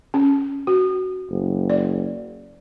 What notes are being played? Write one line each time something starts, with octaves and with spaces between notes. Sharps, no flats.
C#4
F#4
F#1
D5